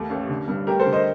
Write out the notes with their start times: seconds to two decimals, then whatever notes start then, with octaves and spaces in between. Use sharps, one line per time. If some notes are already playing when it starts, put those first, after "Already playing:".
Already playing: D#2 A3
0.10 A1
0.29 D3
0.48 G2
0.67 A3 G4 A#4
0.80 A4 C5
0.86 D3
0.93 C5 D#5